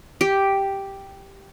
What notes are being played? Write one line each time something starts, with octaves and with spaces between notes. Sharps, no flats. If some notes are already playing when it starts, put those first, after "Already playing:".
G4